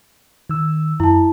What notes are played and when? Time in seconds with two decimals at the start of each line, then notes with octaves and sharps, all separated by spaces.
0.49 D#3 E6
1.00 F#2 E4 A5